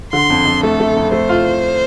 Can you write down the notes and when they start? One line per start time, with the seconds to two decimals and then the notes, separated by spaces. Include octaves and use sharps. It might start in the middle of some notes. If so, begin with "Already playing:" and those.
0.13 D3 C6
0.30 F2
0.45 F2
0.63 A3 A4
0.80 A3
0.96 F2
1.12 A3 C5
1.29 F4